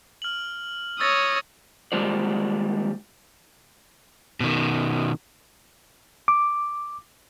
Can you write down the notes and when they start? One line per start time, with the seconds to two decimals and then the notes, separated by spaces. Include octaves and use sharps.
0.22 F6 F#7
1.00 C#5 D#6 E6 A6 A#6
1.92 D#2 G3 G#3 F4 C5 D5
4.40 B2 D#3
6.28 D6